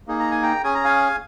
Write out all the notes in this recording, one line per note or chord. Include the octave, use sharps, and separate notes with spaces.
A#3 D#4 G#4
A#5
G#5
G5 A#5
C#4 G#4 G#5
A#5
F5 G#5